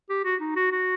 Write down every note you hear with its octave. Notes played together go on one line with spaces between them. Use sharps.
G4
F#4
D#4
F#4
F#4